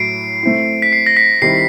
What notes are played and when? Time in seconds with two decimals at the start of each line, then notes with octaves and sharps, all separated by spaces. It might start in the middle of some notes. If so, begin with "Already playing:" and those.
Already playing: A2 F#3 E4 C7 D7
0.43 A3 C4 E4
0.82 B6
0.92 C7
1.06 A#6
1.17 B6
1.42 D#3 G3 C4 E4 C7